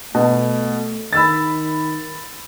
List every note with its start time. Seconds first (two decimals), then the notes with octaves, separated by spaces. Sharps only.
0.15 B2 A3
1.13 D#3 B5 E6 A6